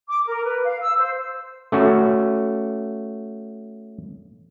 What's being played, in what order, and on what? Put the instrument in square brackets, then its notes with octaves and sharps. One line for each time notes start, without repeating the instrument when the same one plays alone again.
[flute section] D6
A#4
B4
F5
E6
C5
[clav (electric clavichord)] A3 C#4 F#4